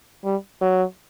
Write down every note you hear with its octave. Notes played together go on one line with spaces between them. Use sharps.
G3
F#3